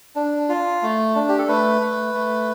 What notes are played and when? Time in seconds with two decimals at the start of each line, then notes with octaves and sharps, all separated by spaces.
0.15 D4
0.49 F4
0.82 A3
1.15 D4
1.29 G4
1.39 A4
1.48 A3 B4
1.81 A3
2.14 A3